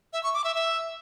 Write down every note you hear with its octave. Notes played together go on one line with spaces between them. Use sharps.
E5
C#6
D6
E5
E5